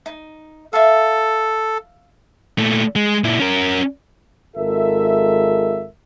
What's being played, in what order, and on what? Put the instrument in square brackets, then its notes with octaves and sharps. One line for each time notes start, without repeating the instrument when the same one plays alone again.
[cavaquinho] D#4
[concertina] A4 [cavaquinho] E5 F5
[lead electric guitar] A#2 A3
G#3
A#2 E4
C#4 A#4
[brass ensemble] G#1 G#3 F4 A4 A#4 E5